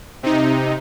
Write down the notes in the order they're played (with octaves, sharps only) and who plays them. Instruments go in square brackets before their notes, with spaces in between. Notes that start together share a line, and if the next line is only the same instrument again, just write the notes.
[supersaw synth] C3 D#4